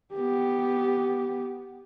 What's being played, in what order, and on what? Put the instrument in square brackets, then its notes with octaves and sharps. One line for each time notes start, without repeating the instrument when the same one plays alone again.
[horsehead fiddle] B3 G4